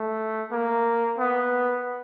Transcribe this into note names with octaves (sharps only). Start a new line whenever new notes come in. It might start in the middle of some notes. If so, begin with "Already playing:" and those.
Already playing: A3
A#3
B3